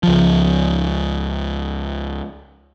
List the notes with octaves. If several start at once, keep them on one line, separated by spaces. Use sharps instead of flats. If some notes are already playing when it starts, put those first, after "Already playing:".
C#2 F3